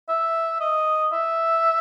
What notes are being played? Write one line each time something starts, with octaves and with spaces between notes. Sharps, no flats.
E5
D#5
E5